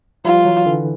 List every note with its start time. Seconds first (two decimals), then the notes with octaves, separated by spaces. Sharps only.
0.25 F3 G3 F4
0.45 E3 F#3
0.66 D3 E3